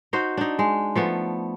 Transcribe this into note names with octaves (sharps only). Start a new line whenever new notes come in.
D#4 F#4 C5
D4 D#4
G#3
F3 A3 B3